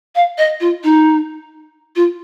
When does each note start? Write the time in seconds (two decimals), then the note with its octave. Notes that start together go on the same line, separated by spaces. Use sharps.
0.15 F5
0.38 D#5
0.60 F4
0.84 D#4
1.96 F4